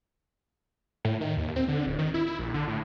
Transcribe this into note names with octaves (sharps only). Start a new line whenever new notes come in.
A2
D#3
D#2
C4
D3
D1
D#3
E4
E4
A#1
D3
A2